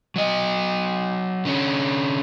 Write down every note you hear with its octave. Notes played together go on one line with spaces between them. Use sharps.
F#3 D#5
D3 C#4